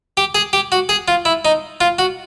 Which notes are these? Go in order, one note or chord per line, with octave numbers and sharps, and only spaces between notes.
G4
G#4
G4
F#4
G#4
F4
E4
D#4
F4
F#4